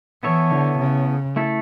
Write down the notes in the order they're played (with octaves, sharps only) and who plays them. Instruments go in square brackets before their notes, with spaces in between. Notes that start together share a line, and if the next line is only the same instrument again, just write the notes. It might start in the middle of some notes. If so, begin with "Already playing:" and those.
[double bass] E3 [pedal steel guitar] B3 E4 A4 C#5
[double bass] D3
C#3
[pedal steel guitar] A3 E4 A4